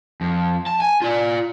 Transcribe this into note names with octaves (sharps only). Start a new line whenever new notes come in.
F2
A5
G#5
F4 D5